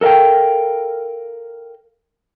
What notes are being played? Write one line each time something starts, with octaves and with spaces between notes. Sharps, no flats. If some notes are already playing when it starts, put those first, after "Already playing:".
A4 A#4 E5 F5 G5